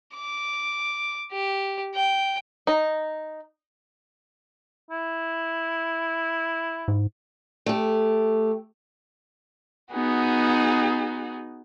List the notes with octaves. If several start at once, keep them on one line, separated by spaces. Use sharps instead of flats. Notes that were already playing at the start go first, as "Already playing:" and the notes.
D6
G4
G5
D#4
E4
G#2
A3 G4
B3 D#4 F#4 G#4